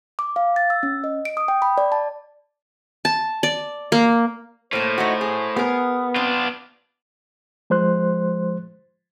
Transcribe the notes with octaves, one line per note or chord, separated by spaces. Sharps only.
D6
F5
A6
E6
C#4
D#5
D7
D#6
G5
B5
D5
A5
A5
D5
A#3
A2 A#3 A4 C5
A3 D#4 F#4
G#4
B3 G#4 A#4
C4 D4 F4
F3 G#3 C5 C6 F#6